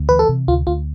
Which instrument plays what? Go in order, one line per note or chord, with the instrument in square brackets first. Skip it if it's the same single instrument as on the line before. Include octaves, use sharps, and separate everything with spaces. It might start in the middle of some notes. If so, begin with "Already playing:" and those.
Already playing: [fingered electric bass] D2
[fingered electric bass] E3 [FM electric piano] B4
[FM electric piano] A4
[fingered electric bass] C3
[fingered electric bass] D2 [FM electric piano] F4
[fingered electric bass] D2 [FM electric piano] F4